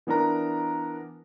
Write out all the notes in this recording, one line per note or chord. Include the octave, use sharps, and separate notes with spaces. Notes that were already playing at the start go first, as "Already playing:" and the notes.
E3 B3 D4 A#4 A#5